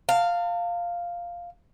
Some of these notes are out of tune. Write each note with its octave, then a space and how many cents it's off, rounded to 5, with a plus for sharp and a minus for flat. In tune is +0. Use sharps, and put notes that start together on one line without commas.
F5 +0 A5 +45